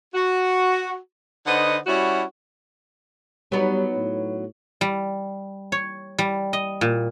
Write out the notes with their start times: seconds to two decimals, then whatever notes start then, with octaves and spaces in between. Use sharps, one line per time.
0.14 F#4
1.46 D3 D#4 B4 C5 D#5 F#5
1.87 G3 C#4 E4 F#4
3.52 F#3 G3 B3 D#4
3.96 A2
4.81 G3
5.72 C#5
6.18 G3
6.53 D#5
6.81 A#2